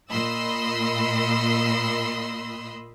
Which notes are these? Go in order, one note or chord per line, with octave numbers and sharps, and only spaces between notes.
A#2 D#5 B5 C6 E6